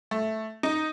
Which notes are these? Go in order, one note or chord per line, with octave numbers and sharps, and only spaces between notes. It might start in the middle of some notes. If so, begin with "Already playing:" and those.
A3
D#4